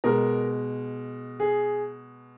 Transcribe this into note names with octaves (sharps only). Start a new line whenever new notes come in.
B2 G#3 A#4
G#4